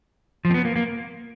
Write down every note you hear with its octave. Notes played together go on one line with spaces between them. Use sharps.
F3
C4
B3
A#3
A#3